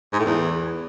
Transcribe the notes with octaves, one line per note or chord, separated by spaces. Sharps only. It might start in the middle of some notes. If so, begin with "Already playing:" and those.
G#2
A2
E2